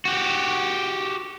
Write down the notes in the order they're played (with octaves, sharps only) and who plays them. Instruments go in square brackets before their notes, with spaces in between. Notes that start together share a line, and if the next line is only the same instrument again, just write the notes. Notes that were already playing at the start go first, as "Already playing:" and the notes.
[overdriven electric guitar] F#4 G4